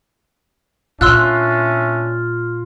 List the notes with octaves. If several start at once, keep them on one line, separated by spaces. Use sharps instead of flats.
A#2 C#4 D4 F4 E5 C6 E6 F#6